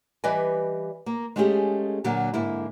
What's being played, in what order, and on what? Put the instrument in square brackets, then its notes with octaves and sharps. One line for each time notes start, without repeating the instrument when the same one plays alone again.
[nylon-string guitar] E3 G3 B4 D5 D#5 G#5
A#3
G#3 A3 C#4 F4 G4 G#4
A#2 D3 F#3 A#3
G#2 D3 A#3 E4